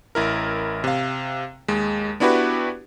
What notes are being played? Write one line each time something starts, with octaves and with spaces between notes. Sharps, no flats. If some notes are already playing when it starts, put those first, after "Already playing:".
A1 E4 A#4
C3 F5
D#2 G#3
B3 D4 E4 F#4 G4 B4